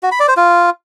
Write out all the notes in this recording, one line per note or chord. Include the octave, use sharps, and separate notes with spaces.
F#4
B5
D5
C5
F4